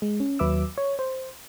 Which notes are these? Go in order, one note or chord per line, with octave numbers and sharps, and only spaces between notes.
G#3
C#4
D#2 F#3 B4 E5 D6 E6
C#5
C5